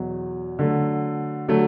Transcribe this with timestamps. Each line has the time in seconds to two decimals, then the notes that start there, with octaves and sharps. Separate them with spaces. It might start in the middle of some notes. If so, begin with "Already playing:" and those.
Already playing: E2 B2 F#3
0.59 D3 F#3 A3
1.48 D3 F#3 A3